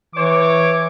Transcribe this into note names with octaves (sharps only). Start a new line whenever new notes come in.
E3 C#5 D6